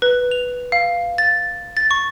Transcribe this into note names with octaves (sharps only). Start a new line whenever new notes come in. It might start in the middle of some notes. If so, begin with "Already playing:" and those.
B4
F7
F5
A6
A6
C#6